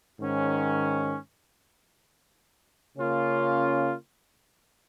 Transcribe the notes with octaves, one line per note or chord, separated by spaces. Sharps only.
G#2 D#3 C#4
C#3 A#3 C#4 F4